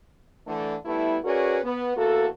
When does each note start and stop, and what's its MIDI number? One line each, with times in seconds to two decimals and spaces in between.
0.47 0.74 50
0.47 0.74 52
0.47 0.74 57
0.85 1.17 55
0.85 1.17 57
0.85 1.17 59
0.85 1.17 64
1.24 1.59 61
1.24 1.59 66
1.24 1.59 68
1.24 1.59 70
1.24 1.59 71
1.24 1.59 74
1.64 1.93 59
1.97 2.27 40
1.97 2.27 58
1.97 2.27 66
1.97 2.27 69